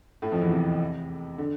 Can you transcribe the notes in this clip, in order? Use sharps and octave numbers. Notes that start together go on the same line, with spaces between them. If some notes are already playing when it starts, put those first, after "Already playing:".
A2 A3
F2 F3
E2 E3
C3
D3